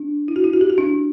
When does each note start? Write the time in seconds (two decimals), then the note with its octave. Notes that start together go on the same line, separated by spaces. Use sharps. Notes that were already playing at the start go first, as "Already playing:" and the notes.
Already playing: D4
0.28 E4
0.36 F#4
0.44 E4
0.54 F#4
0.61 G4
0.70 F#4
0.78 D4